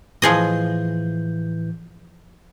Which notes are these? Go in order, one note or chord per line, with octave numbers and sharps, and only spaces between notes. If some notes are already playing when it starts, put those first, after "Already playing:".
A2 E3 F3 G#4 D#5 G6